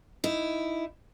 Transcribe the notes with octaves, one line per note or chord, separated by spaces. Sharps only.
D#4 E4